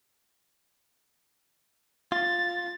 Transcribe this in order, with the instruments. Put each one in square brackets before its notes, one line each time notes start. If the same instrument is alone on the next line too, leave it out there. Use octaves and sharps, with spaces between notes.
[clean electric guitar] F4 [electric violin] A6